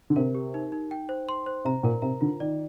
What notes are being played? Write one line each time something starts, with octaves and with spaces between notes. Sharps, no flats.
D3
C3 A#4
G4
D#4
D#4
G5
C5
C6
C5
C3 A#5
A#2 A#4
C3 A#5
D3 F4
D#3 D5